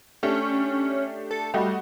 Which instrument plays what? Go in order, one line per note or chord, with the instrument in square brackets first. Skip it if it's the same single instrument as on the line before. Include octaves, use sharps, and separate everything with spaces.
[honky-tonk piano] A3 D4 G4 [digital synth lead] C#4
[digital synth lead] A4
[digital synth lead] G3 [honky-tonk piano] A3 F#4 D#5